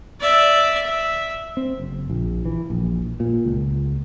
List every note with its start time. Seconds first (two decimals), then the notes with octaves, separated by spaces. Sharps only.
0.20 D5 E5
0.85 E5
1.57 C4
1.80 F#1
2.09 A#1
2.45 E3
2.70 A#1
3.20 A#2
3.45 C#2